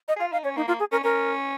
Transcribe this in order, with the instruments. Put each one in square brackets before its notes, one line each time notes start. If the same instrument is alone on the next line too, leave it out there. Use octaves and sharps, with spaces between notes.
[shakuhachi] D#5
[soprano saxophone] G#4
[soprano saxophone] F4 [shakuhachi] F5
[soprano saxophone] D#4 [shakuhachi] F5
[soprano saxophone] C#4 [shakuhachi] C#5
[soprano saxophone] A#3 [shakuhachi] D#4
[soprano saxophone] A#3 [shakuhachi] F4
[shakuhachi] G#4
[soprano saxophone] C#4 [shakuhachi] A#4
[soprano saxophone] C#4 [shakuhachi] A#4